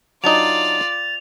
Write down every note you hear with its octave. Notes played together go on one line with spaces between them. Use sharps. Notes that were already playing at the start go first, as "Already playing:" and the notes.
F#3 D4 D#4 F4 D5 A6 F7